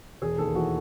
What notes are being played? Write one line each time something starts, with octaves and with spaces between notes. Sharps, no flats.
E1 G#4
D#2 A4
E3 F#4